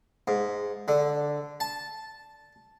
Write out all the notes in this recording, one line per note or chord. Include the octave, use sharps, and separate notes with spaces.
G#2
D3
A5